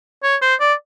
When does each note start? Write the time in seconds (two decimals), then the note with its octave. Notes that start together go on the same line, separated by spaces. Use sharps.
0.23 C#5
0.42 C5
0.60 D5